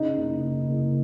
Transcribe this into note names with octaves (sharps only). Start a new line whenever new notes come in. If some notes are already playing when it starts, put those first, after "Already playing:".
Already playing: C#3 D#4
F#1
F#1
F#1